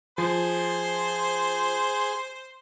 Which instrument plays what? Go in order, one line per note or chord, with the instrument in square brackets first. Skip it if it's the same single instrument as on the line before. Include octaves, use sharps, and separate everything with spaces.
[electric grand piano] F3 [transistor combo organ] G#4 C6 [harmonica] C5